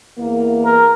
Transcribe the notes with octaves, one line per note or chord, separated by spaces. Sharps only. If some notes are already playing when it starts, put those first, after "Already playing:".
E2 E3 A#3
A#4